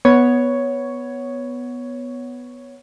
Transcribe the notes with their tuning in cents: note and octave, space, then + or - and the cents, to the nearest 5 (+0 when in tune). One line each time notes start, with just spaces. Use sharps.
B3 +0 C#5 +5